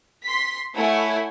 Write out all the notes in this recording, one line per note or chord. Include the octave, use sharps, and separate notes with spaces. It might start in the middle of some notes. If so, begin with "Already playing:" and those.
C6 B6
A3 E4 C#5 F#5 G#5